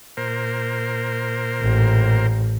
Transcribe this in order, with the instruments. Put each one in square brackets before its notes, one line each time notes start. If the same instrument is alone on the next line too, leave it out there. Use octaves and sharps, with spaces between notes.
[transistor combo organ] A#2 A#4 C5
[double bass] A1